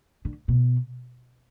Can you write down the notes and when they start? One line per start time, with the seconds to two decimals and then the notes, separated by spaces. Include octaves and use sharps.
0.25 D3
0.48 B2